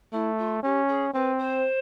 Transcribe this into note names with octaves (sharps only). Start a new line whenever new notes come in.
A3 E4
F4
C#4 G4
G#4
C4 B4
C5